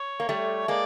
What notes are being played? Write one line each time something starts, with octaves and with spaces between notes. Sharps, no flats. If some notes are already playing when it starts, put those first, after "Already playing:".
Already playing: C#5
A#3
G3 A3
G#3 A#3 D5